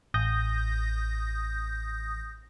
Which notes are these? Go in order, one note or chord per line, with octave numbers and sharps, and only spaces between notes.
A1 D#6 G6 A#6